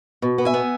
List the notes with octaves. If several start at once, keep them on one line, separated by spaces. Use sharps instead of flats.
B2
B3
E5 G#5
B3